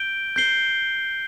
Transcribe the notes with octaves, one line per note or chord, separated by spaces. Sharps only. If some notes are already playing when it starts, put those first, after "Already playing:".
Already playing: G6 D7 G7
G6 C7 G7